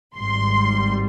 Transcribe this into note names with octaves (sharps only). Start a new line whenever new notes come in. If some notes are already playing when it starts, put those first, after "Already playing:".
G#1 G#2 G3 C6